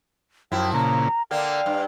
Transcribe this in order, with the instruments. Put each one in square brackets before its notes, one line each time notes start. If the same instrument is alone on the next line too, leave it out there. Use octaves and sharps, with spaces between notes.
[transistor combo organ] F#2 [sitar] F3 E4 [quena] G5
[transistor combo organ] A#2 C#3 [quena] A#5
[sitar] D3 A#3 D4 [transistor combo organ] F5 [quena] G5
[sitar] G2